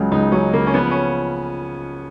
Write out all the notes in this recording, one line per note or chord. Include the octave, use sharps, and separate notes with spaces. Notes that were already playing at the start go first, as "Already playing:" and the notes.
Already playing: C#2 C#3 F#3
C#2 D#4
F#3 C#4
C#3 A#3
C#4
F3 B3
C#4